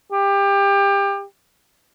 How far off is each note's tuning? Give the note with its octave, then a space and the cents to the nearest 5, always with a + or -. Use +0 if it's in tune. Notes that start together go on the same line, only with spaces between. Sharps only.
G4 +25